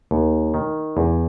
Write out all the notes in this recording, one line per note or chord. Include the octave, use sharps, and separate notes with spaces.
D#2
D#3
E2